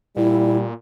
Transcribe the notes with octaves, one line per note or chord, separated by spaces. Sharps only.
A#2 G3 E4